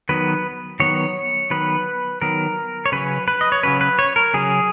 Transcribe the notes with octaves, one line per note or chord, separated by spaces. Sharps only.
D#3 F#3 B3 B4
D#3 F#3 B3 C#5
D#3 F#3 B3 B4
D#3 F#3 B3 A#4
C#5
C#3 F#3 C#4 B4
B4
D#5
C#5
C#3 F#3 C#4 B4
B4
C#5
A#4
C#3 F#3 C#4 G#4